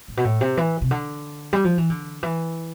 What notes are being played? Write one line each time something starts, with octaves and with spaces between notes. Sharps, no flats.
A2
B2
A2
C3
E3
C3
D3
G3
F3
E3
D3
E3